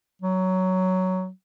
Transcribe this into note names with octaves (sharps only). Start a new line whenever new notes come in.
F#3